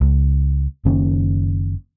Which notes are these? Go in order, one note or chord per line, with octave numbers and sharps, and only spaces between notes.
C#2
F#1 D#3 A#3 C#4